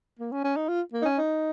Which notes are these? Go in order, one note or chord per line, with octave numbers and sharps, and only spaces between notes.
A#3
C#4
C#4
D#4
F4
A#3
D#4
C#4
D#4